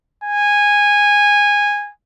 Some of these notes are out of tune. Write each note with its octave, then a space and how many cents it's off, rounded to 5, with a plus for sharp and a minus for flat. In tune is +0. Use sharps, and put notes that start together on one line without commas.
G#5 -15